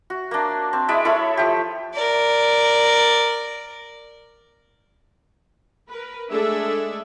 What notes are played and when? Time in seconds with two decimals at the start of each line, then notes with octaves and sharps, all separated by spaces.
0.10 F#4
0.31 A#3 D4
0.73 C4
0.88 G#3 E4 D5 E5
1.05 E4 A4 C#5 B5
1.37 F3 G4
1.94 A#4 D5
5.88 A#4 B4
6.32 G#3 A3 D4 G#4 A4 E5